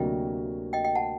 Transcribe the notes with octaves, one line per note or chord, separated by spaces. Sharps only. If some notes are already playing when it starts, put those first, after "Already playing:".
Already playing: D2 C3 F#3 A#3 D4 D#5 G5
D#5 G5
D#5 G5
F#5 A5